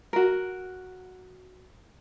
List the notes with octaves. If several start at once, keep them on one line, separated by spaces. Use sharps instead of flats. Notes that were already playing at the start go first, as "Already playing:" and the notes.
F#4 A#4